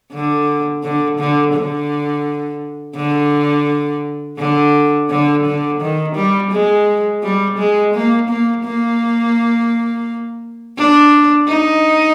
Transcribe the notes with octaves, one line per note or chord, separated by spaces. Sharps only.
D3
D3
D3
D3
D3
D3
D3
D3
D#3
G3
G#3
G3
G#3
A#3
A#3
A#3
D4
D#4